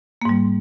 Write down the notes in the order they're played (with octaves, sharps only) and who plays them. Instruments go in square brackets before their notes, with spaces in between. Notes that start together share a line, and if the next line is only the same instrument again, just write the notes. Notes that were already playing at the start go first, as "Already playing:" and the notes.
[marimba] A#3
G#2
G3